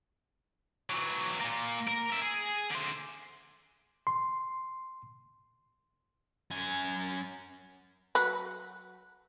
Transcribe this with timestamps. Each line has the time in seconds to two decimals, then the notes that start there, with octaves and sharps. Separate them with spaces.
0.90 E3 F#3
1.41 A#2 A#3
1.88 A#4
2.10 A#4 E5
2.22 G#4
2.70 D3 C5
4.07 C6
6.50 F#2 G#5
8.15 F#3 F#4 B4